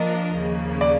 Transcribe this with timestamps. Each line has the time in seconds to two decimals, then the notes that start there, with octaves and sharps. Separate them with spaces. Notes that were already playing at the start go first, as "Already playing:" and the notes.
Already playing: F3 A#3 D4 F4 A#4 D#5
0.37 D#2 C#3 F3 A#3
0.81 D5